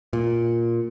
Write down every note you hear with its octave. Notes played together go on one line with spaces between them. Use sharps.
A#2